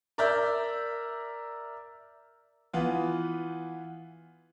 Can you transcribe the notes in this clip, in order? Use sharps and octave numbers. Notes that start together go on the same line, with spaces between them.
A#4 D5 E5 A#5 E6 G6
E3 B3 F4